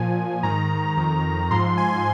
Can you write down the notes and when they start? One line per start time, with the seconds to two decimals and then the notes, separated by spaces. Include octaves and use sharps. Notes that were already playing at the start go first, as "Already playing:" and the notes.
Already playing: A#2 F3 G#5
0.43 G#2 D#3 A#5
0.97 F2 D#3
1.51 G#2 F3 C6
1.78 G#5